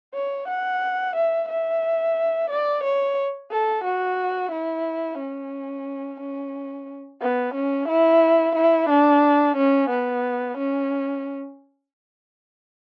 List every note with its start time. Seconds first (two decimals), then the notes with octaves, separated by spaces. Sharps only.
0.14 C#5
0.48 F#5
1.16 E5
1.49 E5
2.50 D5
2.84 C#5
3.51 A4
3.84 F#4
4.52 E4
5.19 C#4
6.20 C#4
7.21 B3
7.54 C#4
7.89 E4
8.56 E4
8.89 D4
9.56 C#4
9.90 B3
10.58 C#4